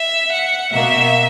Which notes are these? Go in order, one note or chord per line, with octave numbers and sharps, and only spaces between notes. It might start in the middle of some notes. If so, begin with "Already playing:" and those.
Already playing: E5
F#5
B2 A#3 E5